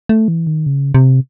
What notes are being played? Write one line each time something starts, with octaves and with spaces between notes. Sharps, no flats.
A3
E3
D#3
C#3
C3